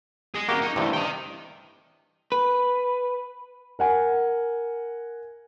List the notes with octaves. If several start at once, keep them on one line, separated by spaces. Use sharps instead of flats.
G#4 D#5
A#3 C#4 F#4 G4
D#4
G2 C3 E3 A3
D#5 G5
B4
A#4 F#5 G#5